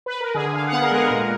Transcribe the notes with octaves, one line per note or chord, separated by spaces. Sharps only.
B4
A#4
D3 G#4
D3 F5
F#5
B3 F5
A#4
G#3 G#4
A#4
A#2